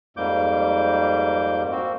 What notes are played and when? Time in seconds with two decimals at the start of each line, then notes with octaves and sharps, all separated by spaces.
0.17 F2 G#2 G3 A#3 D6 G6
1.71 A#3 C4 F#4